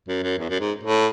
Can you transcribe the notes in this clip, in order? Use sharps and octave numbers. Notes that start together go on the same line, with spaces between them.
F#2
F#2
E2
F#2
G#2
A2